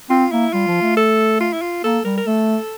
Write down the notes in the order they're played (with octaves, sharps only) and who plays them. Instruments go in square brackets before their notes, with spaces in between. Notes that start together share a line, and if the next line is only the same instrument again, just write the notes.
[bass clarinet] C4 [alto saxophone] F4
[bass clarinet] A#3 [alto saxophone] E4
[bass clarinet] G3 [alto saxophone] F4
[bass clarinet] F3
A3
[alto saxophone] A4
F4
E4
F4
[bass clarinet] A#3 [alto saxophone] A4
[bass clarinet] G3 [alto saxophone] A#4
[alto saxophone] A#4
[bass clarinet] A3 [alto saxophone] A4